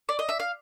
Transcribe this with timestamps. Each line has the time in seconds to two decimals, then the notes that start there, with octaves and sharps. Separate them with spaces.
0.09 D5
0.19 D#5
0.29 E5
0.40 F5